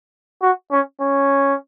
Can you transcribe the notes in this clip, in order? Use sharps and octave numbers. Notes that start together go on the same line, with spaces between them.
F#4
C#4
C#4